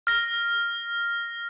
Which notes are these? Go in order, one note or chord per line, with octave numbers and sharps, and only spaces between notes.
F6 A#6